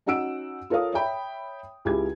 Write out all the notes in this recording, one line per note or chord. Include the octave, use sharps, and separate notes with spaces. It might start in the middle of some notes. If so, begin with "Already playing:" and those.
C#4 D#4 F#4 F#5 E6 D7
F4 A4 A#4 C#5 F5 D#6
C#5 E5 G5 B5
C#2 E4 G4 G#4 G#6